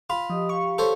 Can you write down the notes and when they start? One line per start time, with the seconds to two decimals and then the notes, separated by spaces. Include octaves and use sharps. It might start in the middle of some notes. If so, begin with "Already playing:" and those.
0.10 F4 B5
0.30 F3 G4 D#5 D#6
0.49 G4 F5 C#6
0.78 A4 C5 C#5